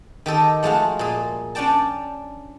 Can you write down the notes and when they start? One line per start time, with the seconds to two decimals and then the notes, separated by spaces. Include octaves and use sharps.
0.26 D#3 G4 A4 D#5
0.63 F3 G#3 A3 F4 F#4
0.99 A#2 G#4
1.55 C#4 D4 D5 G5 A5